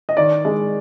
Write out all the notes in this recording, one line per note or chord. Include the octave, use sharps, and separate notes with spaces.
D#5
D#3 D5
G#3